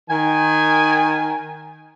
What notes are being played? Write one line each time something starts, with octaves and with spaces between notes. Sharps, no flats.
D#3 G#5